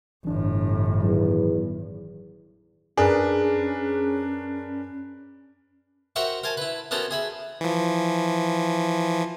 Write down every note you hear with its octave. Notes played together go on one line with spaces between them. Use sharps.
G1 A2 E3 D4
E2 D#3 F#3
F#2 C#4 D4 G#4 A#4 B4
F#4 A#4 C5 E5 G5 C#6
A#4 C5 G#5 A5
E4 B4
B3 C#4 F#4 A4 A#4 C5
G#4 E5 B5
E3 F3